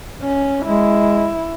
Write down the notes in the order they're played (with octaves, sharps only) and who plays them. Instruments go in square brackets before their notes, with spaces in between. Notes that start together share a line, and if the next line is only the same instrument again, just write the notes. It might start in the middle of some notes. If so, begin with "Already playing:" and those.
[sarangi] C#4
[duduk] G#3 [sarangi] E4